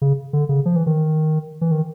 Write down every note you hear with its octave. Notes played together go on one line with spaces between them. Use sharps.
C#3
D3
C#3
F3
E3
D#3
E3
D#3